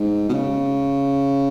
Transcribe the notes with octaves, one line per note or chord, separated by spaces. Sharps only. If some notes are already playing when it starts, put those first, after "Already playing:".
Already playing: G#2
B2
C#3